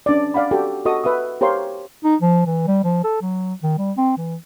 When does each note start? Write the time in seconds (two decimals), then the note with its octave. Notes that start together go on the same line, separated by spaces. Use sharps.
0.06 C#4 D4 B4 D5
0.34 D5 F5 F#5 B5
0.51 F#4 G4 A4
0.85 F#4 A4 D#5 C#6 D#6
1.04 B4 E5 F#5 D#6
1.41 G4 A#4 C5 C#5 F5 C6
2.04 D#4
2.22 F3
2.46 E3
2.67 G3
2.84 F3
3.04 A4
3.22 F#3
3.63 D#3
3.78 G3
3.97 C4
4.18 E3